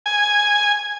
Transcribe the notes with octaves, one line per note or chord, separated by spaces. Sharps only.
G#5